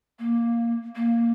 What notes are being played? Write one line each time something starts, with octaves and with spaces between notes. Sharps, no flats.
A#3
A#3